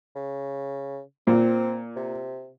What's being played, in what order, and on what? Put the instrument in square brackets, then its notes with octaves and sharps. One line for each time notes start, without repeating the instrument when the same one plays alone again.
[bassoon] C#3
[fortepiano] A#2 [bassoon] C4
[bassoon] C3